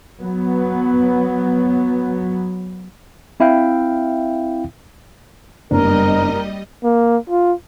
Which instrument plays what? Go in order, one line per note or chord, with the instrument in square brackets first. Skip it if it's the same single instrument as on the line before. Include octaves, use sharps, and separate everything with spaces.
[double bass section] F#3 B3
[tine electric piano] C4 E4 E5 F5 G5
[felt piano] F#1 [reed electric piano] G2 B3 D4 [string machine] G3 D#5 [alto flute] A#4
[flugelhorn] A#3
F4